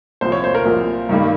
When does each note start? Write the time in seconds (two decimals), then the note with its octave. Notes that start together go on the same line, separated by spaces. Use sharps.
0.21 C2 A#2 F3 C5
0.32 C#5
0.44 C5
0.55 A#4
0.65 C2 A#2 F3
1.09 G2 D#3 G3 A#3